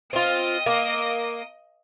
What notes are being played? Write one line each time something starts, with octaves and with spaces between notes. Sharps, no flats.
C4 F4 D#5 D#7
A#3